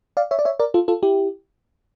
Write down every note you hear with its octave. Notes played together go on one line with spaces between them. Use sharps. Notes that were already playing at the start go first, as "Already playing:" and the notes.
D5 F5
C#5 E5
D5
C#5 E5
A#4 D5
F4 A4
F4 A4
E4 G4